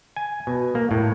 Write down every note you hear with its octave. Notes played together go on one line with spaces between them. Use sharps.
G#5
B2
A#3
A2